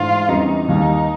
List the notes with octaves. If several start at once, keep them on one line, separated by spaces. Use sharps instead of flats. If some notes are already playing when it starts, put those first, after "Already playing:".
Already playing: G#2 E3 A3 D4 F4
E2 C#3 E3 G3 C4 D#4
D#2 D#3 G3 D#4